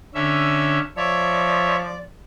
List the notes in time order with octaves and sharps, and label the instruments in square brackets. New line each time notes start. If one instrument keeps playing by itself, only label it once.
[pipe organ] D3 C#4 E5
[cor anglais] F3 [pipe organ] C#5 E5 [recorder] D5